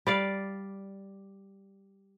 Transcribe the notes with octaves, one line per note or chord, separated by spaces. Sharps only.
G3 D5 F5